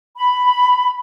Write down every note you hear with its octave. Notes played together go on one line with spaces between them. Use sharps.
B5